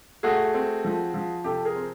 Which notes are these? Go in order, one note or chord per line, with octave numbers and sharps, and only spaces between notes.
A3 F#4 G#4
C4
F3
F3
C3 G4 A4
G#4 A#4
C4